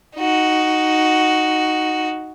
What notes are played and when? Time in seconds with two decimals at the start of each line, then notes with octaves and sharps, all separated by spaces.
0.16 D#4 F#4